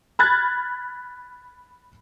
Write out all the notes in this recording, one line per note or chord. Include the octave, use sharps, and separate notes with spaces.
B5 F6 F#6 G#6 A6